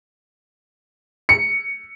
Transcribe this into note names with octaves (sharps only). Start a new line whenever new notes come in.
C#7